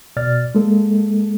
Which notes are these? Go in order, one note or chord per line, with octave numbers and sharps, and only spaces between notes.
B2 D5 F6 A6
G#3 A#3 A4